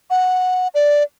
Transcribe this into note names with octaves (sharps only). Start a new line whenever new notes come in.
F#5
D5